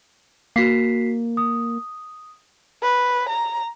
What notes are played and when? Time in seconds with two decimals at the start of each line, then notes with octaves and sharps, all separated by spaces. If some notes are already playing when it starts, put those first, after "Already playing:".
0.56 A#3 F#4 B6 C7
1.37 D#6
2.83 B4
3.29 A#5